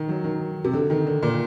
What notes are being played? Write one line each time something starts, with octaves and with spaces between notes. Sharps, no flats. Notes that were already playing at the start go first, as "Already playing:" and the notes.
Already playing: D#3
F#3
D#3
C3
D3
D#3
D3
A#2